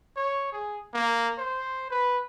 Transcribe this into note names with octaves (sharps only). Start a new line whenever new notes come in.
C#5
G#4
A#3
C5
B4